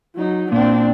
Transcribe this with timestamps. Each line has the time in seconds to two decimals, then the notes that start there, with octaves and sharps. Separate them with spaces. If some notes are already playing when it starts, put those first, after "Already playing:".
0.15 F#3 D#4
0.52 A#2 C4 D4